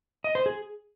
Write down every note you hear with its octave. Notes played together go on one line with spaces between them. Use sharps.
D#5
C5
G#4